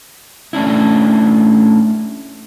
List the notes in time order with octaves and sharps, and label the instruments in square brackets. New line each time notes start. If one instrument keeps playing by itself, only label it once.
[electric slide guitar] A3 C#4 D4 E4